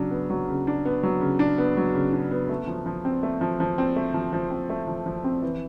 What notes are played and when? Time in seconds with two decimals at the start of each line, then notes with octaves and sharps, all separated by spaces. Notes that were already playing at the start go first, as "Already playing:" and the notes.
Already playing: C#3 F#3 D4
0.11 B3
0.30 F#3
0.48 C#3
0.67 D4
0.85 B3
1.03 F#3
1.21 C#3
1.39 D4
1.58 B3
1.77 F#3
1.95 C#3
2.13 D4
2.31 B3
2.49 A3
2.68 F3
2.86 F3
3.05 C4
3.23 A3
3.41 F3
3.60 F3
3.78 C4
3.96 A3
4.14 F3
4.33 F3
4.50 C4
4.70 A3
4.87 F3
5.06 F3
5.24 C4
5.42 E3